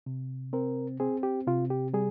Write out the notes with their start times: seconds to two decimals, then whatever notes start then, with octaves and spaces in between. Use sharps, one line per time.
0.06 C3
0.53 C4 A#4
1.00 C4 G#4
1.23 G4
1.47 C3 F4
1.70 G4
1.94 G3 G#4